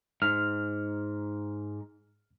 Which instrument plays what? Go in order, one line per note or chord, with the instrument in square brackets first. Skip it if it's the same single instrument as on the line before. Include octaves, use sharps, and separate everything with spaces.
[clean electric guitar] G#2 [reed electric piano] F6